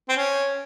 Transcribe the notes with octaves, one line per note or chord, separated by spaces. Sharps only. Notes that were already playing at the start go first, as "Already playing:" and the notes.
C4
C#4